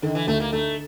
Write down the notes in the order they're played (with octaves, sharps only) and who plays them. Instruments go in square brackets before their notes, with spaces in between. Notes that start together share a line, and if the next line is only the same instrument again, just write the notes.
[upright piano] D3 [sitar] D#3
[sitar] E3
[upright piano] D2 [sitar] A3
[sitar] A#3
[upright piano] D3 [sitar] A3